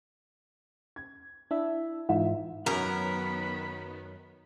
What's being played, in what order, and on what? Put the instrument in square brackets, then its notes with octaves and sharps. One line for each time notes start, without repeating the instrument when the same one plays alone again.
[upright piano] G#6
[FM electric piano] D4 E4 E5
[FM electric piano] G#2 E3 [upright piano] D#4 F4 E5
[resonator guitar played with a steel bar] F#2 F#3 [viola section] D#3 B3 [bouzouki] A#4 [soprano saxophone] B5